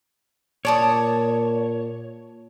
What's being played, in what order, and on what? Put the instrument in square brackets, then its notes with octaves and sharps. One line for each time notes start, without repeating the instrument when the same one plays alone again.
[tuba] A#2 [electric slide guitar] C#5 [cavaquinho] D5 A5 D#6